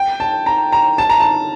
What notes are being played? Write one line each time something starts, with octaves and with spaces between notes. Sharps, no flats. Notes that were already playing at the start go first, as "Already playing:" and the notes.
Already playing: G5
A5
A#5
A#5
A5
A#5
A5